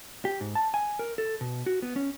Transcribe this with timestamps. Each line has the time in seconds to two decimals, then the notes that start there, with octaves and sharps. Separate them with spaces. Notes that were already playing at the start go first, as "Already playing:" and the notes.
0.25 G4
0.41 G#2
0.55 A5
0.74 G#5
0.99 A#4
1.18 A4
1.41 B2
1.66 F#4
1.82 B3
1.96 C#4